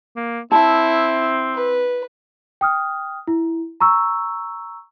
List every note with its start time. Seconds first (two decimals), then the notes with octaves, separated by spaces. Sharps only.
0.16 A#3
0.52 C4 E4 A5
1.55 B4
2.61 G5 D#6 F6
3.27 E4
3.81 A#5 C#6 E6